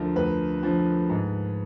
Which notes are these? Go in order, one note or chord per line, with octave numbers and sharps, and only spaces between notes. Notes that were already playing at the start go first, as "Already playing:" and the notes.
Already playing: D2 D3 F3 A#4
D2 B4
D3 F3
G#2